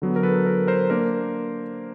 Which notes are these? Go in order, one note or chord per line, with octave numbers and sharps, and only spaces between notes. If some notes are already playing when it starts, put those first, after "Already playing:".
D3 F#3 B3
A#4
A4 B4
A#4
A#4 C5
A#3 D4 A#4 C5